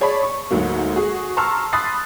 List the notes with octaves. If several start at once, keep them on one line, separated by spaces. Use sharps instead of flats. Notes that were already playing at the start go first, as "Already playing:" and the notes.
G#4 C#5 D5 A5 B5
C#6
D2 G#2 F#3 A#3
F#4 G#4
A5 A#5 C6 C#6 E6 F6
B5 C6 D#6 F#6 A6 C7